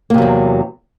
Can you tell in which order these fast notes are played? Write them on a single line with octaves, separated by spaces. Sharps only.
A#3 C3 F#3 E2